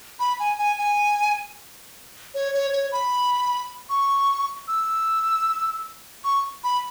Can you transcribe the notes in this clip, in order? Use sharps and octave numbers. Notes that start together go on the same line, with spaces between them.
B5
G#5
G#5
G#5
C#5
C#5
C#5
B5
C#6
E6
C#6
B5